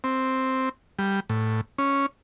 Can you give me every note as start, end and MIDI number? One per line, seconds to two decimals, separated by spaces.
0.04 0.69 60
0.99 1.20 55
1.29 1.61 45
1.78 2.06 61